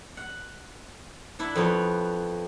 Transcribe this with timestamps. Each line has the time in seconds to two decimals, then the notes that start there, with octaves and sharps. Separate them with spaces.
0.17 F#5
1.39 D4 E4 F#5
1.56 F2 B3 C#5 F#5